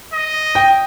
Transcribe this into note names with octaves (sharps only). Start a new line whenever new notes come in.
D#5
G5